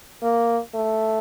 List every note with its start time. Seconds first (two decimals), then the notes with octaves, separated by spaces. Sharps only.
0.23 A#3
0.75 A3